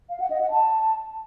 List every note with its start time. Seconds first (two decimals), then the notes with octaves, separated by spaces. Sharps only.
0.09 F5
0.20 F#5
0.30 D#5
0.41 F#5
0.51 A5